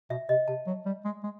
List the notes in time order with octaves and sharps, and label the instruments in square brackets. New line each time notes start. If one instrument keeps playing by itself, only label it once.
[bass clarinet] B2 [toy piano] E5
[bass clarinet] C3 [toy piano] D#5
[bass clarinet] C3 [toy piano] A5
[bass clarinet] F#3
G3
G#3
G#3